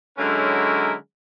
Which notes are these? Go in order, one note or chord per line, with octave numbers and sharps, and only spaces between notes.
D3 F#3 G#3 C#4 E4 A#4